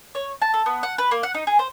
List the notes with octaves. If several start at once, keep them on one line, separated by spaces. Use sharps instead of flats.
C#5
A5
A4
B3
F#5
B4
A#3
F#5
D#4
G#4
C5